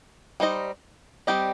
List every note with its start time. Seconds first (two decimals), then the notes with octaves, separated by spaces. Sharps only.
0.40 G3 D#4 C5 D#5
1.27 G3 C4 G4 D#5